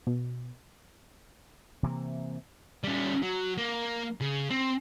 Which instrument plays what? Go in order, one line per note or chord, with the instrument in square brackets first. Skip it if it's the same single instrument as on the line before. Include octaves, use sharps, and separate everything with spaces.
[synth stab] B2
[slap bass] C3 E3 A#3
[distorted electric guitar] G3 C#4
F#3
A#3
C#3
C4